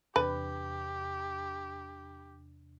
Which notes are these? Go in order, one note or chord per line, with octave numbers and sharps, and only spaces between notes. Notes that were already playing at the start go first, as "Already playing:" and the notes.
E2 C3 D4 G4 B4